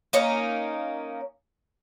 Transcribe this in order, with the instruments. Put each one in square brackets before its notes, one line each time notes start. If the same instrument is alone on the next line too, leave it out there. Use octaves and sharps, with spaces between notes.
[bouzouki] A#3 C#4 D#4